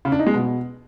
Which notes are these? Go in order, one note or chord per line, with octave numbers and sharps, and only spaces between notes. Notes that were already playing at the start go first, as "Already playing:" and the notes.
C#3
D4
D#4
G#3
B2